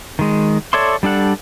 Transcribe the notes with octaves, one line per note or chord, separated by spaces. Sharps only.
D#3 G#3
A4 C#5 D5 E5 C6
G3 D4 A4 F#5